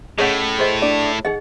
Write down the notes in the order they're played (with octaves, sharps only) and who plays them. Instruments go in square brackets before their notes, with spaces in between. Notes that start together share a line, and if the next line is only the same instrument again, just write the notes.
[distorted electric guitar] A2 [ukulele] C#4 D#5 [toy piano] G#4 C#5 F#5
[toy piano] G#4 D#5 [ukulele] C5
[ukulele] D4 D5
[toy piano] D#4 G#4 D#5 [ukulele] F#5